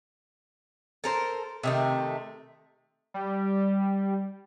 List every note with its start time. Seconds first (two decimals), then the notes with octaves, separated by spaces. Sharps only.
1.04 A4 A#4 C5
1.63 C3 D#3 A3
3.14 G3